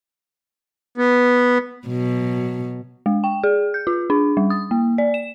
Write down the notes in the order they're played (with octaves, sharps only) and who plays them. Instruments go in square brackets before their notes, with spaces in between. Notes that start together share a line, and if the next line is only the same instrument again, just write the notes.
[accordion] B3
[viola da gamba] B2 F#3
[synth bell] G#3
G5
G#4
G6
F4
D4
G3
D#6
A#3
D5
E7